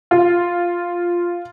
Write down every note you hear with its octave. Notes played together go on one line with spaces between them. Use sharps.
F4